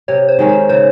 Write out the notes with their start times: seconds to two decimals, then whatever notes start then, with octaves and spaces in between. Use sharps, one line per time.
0.08 C3 C#5
0.29 C5
0.39 D#3 G#3 C#4
0.49 C5
0.69 C#3 C5